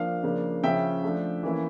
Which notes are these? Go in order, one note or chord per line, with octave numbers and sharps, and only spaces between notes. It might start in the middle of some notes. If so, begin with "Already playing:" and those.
Already playing: F3 A#3 D4 F5
C#3 F3 A#3 D4
C#3 F3 C#4 E5 G5
F3 A3 D4
E3 A#3 C#4 E4